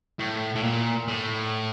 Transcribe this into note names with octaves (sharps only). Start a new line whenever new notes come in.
A2
A2
A#2
A2